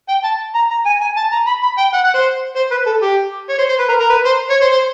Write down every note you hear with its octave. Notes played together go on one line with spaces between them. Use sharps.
G5
A5
A#5
A#5
G#5
G#5
A5
A#5
B5
B5
G5
F#5
F#5
C5
C5
B4
A4
G4
C#5
C5
C5
B4
A#4
A#4
B4
C5
C#5
C5
C5